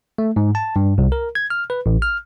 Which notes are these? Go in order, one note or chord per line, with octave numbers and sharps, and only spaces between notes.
A3
G#2
A5
G2
C2
A#4
G#6
F6
B4
A1
F6